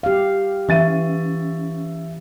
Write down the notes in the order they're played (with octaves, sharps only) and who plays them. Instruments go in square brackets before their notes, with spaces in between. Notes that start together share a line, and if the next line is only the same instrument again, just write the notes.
[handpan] G4 F5
[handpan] E3 [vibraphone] C#4 [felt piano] E5 A6 D#7